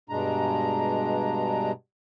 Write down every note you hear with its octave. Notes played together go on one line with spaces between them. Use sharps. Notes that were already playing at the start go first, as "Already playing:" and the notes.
G2 B2 G#3 D4 A#5